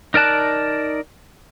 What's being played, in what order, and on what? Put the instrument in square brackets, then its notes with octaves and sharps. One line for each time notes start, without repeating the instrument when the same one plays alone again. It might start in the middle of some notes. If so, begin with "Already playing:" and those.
[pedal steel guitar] D#4 A#4 D5 A5 F#6